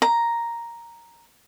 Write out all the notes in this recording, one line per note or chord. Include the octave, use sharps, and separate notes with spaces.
A#5